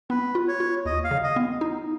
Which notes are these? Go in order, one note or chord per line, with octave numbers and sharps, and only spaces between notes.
B3 B4
F4
C#5
F4
D#2 D#5
F5
C#3
D#5
B3
D#4